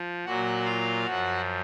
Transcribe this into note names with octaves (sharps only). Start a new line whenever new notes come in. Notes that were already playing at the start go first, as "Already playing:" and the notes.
Already playing: F3
A#2 F#3 F#4 F#5
F4 F5
F#2 F3 F#4 F#5